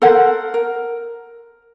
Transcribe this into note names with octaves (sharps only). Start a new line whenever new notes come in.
A4 A#4 C5 F#5
A#4